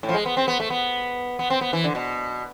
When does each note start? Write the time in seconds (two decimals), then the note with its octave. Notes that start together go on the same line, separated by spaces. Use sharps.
0.03 A2
0.09 F3
0.14 G#3
0.26 B3
0.37 C4
0.48 B3
0.60 A3
0.70 B3
1.39 B3
1.50 C4
1.61 B3
1.73 E3
1.84 D3
1.95 B2